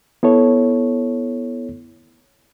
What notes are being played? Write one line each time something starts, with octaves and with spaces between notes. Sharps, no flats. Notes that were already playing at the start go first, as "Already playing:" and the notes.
B3 E4 A4 C#5